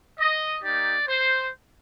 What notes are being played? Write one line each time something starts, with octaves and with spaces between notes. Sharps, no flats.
D#5
A#3 D#4 G4 D5
C5